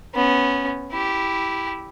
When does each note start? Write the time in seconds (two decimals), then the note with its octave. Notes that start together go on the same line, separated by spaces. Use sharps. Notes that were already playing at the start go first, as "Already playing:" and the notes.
0.15 B3 C#4
0.91 E4 G4